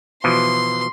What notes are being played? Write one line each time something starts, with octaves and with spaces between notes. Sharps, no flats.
B2 E3 F3 C6